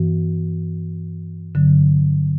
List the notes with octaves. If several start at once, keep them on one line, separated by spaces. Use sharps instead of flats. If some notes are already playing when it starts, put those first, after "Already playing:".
Already playing: G2 E3 B3 F#4
G2 D3 F#3